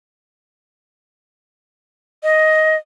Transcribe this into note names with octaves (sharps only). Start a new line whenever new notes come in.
D#5